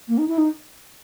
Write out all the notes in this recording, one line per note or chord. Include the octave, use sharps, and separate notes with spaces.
A#3
D#4
E4
D#4